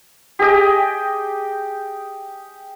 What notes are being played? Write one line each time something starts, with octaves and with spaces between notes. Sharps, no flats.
G4 G#4 D#5 G5